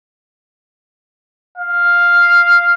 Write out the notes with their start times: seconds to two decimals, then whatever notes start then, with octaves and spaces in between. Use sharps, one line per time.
1.58 F5